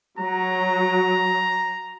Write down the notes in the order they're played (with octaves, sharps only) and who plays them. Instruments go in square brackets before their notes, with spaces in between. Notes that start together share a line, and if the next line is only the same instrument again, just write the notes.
[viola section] F#3 [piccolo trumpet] A#5